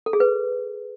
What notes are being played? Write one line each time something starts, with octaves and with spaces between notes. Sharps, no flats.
A4
G#4
B4